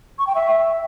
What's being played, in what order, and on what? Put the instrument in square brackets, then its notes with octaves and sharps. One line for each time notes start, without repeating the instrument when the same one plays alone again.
[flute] C#6
G5
E5